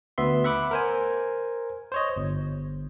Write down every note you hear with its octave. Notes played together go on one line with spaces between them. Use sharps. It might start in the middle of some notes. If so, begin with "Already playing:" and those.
D2 B3 E5 C6
E5 F#5 B5 D6
A#4 C5 G#5
C5 C#5 D#5
G1